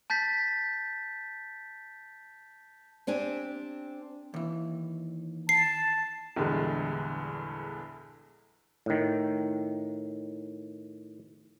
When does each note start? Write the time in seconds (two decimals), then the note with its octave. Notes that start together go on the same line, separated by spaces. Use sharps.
0.10 A5 G6 A6 B6
3.07 C4 D4 G4 G#5
4.34 D#2 E3
5.49 A5 C7
6.36 A#1 E2 G2 D3 G#3
8.86 A2 D#3